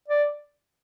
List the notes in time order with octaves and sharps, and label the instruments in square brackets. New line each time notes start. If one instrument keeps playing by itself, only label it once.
[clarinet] D5